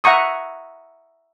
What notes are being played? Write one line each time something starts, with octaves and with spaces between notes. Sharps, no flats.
E5 F#5 A#5 C#6 D#6